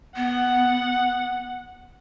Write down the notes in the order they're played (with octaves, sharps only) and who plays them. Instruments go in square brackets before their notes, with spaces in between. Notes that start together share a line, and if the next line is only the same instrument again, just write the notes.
[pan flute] B3 [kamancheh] F#5